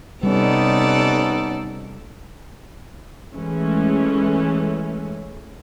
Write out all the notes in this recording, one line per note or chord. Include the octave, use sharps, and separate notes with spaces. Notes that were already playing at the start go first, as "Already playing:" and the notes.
C3 G3 B3 C#4 D#4 A4 D5
E3 G#3 A3 C#4 E4